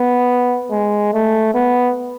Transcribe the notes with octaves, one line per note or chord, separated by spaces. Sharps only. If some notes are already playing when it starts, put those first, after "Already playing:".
Already playing: B3
G#3
A3
B3